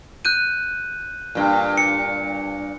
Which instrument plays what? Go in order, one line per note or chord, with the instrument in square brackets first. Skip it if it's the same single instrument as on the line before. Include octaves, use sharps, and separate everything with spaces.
[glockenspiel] F#6 G6 D#7
[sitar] G2 A#2
[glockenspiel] C#7